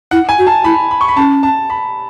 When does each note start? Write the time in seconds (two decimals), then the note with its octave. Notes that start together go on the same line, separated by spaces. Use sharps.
0.11 E4 F#5
0.29 G#5
0.38 F#4
0.47 A5
0.64 E4 B5
0.91 B5
1.01 C#6
1.08 B5
1.16 C#4 A5
1.43 A5
1.70 B5